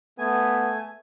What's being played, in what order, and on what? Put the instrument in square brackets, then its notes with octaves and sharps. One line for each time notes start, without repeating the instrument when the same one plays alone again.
[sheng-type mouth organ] A3 G#5 [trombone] B3